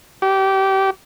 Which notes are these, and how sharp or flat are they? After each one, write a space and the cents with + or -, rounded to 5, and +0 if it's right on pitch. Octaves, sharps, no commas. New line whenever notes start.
G4 -25